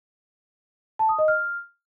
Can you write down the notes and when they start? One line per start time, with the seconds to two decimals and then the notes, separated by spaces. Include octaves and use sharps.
0.99 A5
1.09 D#6
1.18 D#5
1.28 F6